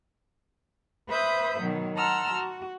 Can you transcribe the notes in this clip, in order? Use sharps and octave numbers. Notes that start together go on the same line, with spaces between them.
B4 C5 E5 B5 D#6 G6
B2 D#3 F#3
F#5 A5 A#5 C6 E6 F6
F#4